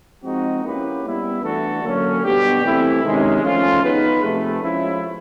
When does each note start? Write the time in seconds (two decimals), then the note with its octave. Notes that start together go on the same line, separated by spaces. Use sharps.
0.23 F3 G#3 C4 D#4 F#4
0.63 A#3 C#4 E4 G4 B4
1.04 G3 B3 E4
1.43 E3 A3 D4 F#4 A4
1.83 D3 F#3 A#3 C#4
2.23 B2 G3 B3 D4 G4
2.63 E3 A3 C4 E4
3.02 C3 D#3 G#3 C#4
3.42 F3 A3 C#4 F4
3.83 B3 D#4 G#4 B4
4.22 C3 F3 A3
4.62 F3 G#3 C#4 E4